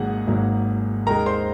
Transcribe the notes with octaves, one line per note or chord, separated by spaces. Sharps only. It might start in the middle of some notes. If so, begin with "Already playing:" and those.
Already playing: G#1 G#2 F#3 A#3 G#4 F#5
G#1 G#2 F#3 A#3
D#2 D#3 G#3 A#4 A#5
C5 C6